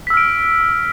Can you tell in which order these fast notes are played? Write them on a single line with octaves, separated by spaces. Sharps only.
B6 E6 F6 D7